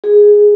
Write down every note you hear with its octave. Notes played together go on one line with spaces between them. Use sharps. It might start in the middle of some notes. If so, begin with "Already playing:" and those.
G#4